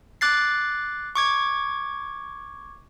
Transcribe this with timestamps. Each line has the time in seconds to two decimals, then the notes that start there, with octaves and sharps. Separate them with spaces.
0.21 D6 F#6 A6 C7
1.15 C#6 D6 G#6